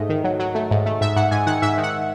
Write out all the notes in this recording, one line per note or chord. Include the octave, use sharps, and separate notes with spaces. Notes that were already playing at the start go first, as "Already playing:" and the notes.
Already playing: G#2 A3 D#5
D#3
F#3
F#3
A3
G#2
A3
G#2 E5
G#2 F#5
G#2 G#5
D#3 F#5
G#2 E5
D#3
F#5